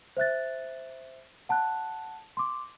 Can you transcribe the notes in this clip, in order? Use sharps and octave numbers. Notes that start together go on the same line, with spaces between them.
C5 E5 F#6 A6
F#5 A5 B5 F#6
C6 D6